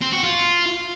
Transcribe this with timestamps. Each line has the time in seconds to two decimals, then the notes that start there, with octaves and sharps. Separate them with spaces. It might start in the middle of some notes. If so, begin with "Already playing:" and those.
0.01 C4
0.12 F#4
0.23 F4